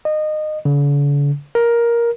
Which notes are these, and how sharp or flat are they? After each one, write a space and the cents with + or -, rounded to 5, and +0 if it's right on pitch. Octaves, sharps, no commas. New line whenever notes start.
D#5 -25
D3 -45
A#4 +10